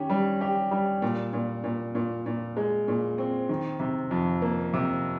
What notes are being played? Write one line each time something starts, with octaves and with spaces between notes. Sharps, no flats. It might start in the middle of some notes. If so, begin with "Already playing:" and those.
Already playing: D#3 C#4 G4
G3
G4
G3
A#2
A#2
A#2
A#2
A#2
G#3
A#2
C4
D#3
C3
F2
A#3
C3